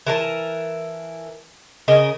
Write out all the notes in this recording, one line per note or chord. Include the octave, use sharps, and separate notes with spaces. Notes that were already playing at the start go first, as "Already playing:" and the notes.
E3 A#4 A5
C#3 A#4 D#5